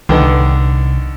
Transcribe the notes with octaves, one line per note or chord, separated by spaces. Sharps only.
C2 D3 D#3 B3